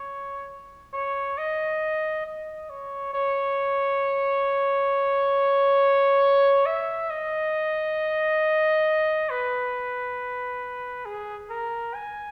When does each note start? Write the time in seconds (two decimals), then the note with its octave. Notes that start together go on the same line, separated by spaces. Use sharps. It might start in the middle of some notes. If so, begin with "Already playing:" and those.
Already playing: C#5
0.93 C#5
1.38 D#5
2.26 D#5
2.70 C#5
3.14 C#5
6.66 E5
7.10 D#5
9.30 B4
11.06 G#4
11.50 A#4
11.94 G#5